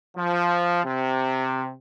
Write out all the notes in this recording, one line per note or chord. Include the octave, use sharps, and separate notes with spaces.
F3
C3